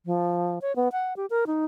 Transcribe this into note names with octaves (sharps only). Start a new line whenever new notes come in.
F3
C#5
B3
F#5
G4
A#4
D#4